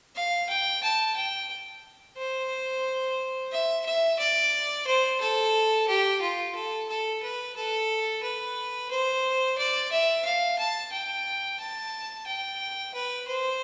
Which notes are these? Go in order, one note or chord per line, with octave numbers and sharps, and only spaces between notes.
F5
G5
A5
G5
C5
E5
E5
D5
C5
A4
G4
F4
A4
A4
B4
A4
B4
C5
D5
E5
F5
A5
G5
A5
G5
B4
C5